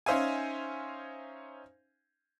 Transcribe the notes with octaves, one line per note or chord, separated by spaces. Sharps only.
C#4 D#4 C5 E5 F5 G#5